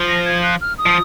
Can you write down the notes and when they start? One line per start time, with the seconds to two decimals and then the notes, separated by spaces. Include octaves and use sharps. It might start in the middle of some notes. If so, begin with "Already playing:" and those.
Already playing: F3
0.08 A#6
0.26 G#6
0.43 F#6
0.61 F6
0.78 D#6
0.86 F3